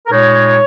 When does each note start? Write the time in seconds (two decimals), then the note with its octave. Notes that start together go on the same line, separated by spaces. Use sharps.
0.07 A#4
0.11 A#2 G#3 D#4 C#5